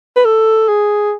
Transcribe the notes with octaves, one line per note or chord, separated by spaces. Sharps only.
B4
A4
G#4